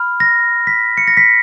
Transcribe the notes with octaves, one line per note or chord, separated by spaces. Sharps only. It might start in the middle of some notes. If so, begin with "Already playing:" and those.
Already playing: B5 F6
A#6
B6
C#7
A#6
B6